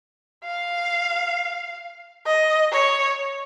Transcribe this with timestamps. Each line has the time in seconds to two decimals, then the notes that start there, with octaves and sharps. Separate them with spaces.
0.45 F5
2.26 D#5
2.72 C#5